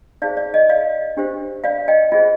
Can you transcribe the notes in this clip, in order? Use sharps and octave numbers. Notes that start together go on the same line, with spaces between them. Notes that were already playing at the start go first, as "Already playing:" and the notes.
D#4 G#4 C5 D5 F5
D5
D#5
D5 F5
D4 G4 C5
D5 F5
D#5 G5
F4 G#4 C5 D#5